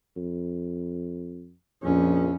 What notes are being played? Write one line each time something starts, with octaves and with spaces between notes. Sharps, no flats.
F2
A#1 F2 C#4